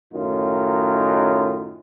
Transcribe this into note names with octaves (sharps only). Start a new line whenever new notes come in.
F#2 A2 D#3 D#4 F4